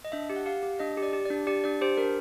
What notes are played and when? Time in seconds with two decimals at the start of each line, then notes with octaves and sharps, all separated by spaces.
0.05 D#5
0.12 D4 E5
0.30 G4
0.36 F#5
0.46 G4 F5
0.63 G4
0.79 D4 D#5
0.97 G4
1.03 D5
1.13 G4
1.25 D5
1.30 D4
1.47 G4 D5
1.64 D4 D5
1.81 G4 C5
1.97 D4 A#4